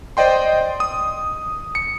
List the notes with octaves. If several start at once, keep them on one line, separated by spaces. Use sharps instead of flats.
C5 D5 D#5 G5 C6
D#6
C#7